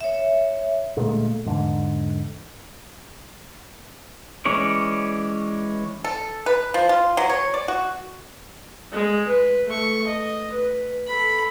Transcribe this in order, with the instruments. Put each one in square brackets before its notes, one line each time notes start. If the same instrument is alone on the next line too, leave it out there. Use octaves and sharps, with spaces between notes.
[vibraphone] C#5 E5
[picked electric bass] D2 A#2 G#3 A3
E2 G#2 D3
[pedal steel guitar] E3 G#3 C#4 C#5 D5
[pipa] A4
B4
F3
F4
F#3
C#5
D5
F#4
[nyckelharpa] G#3
B4
A3 C#6
D#5
B4
A4 B5